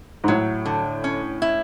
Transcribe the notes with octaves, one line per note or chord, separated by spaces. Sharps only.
G#2
A2 F#3
D3
C#4
E4